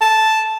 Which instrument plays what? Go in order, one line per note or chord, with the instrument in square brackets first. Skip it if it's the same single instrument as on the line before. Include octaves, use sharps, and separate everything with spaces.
[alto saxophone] A5